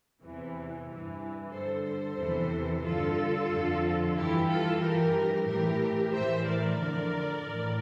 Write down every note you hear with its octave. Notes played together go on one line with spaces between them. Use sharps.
E2 C3 E3
G2 E3
G2 D3 A4 C5
A4 C5
E2 C3 E3
G2 D3 F4 A4
F2 D3
G2 E3 E4 G4
F4 A4
G2 E3 G4 A#4
A2 E3 G4 A#4
A2 E3 C5 E5
A#4 D5
F2 D3
A2 E3